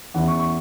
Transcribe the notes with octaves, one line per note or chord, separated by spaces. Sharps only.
E2 E3 C#4 E4 F#5
C#6
C#6